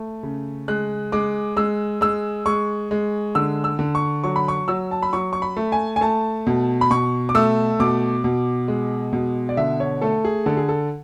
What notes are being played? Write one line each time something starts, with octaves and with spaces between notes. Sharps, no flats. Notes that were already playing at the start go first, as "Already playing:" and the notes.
Already playing: A3
C#3
G#3 F#6
G#3 D6
G#3 E6
G#3 E6
G#3 C#6
G#3
D3 E6
E6
D3
C#6
F#3 C#6
B5
C#6
F#3 E6
A5
B5
F#3 C#6
C#6
B5
A3
G#5
G#5
A3 A5
B2
B5
B2 C#6
D6
A3 E6
B2 D6
B2
G#3
B2
D5
D3 E5
C#5
A3 A4
G#4
D3 A4
G#4
A4